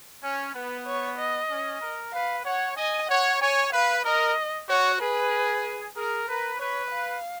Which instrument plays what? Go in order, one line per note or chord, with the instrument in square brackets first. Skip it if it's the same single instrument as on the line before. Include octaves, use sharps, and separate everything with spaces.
[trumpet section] C#4
[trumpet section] B3 [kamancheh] B4
[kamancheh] C#5
D#5
[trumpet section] C#4
A#4
[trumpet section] B4 [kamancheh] F5
[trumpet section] C#5 [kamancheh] F#5
[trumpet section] D#5 [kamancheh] G#5
[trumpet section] C#5 [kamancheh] F#5
[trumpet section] C#5 [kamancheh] G#5
[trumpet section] B4 [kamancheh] F5
[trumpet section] A#4 [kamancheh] D#5
[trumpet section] F#4 [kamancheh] C#5
[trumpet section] G#4 [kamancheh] B4
[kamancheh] G#4 [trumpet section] A#4
[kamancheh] A#4 [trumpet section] B4
[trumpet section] B4 [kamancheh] C#5
[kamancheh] F5